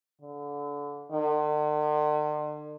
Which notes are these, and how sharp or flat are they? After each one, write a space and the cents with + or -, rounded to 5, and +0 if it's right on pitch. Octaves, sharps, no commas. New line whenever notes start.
D3 -25
D3 +45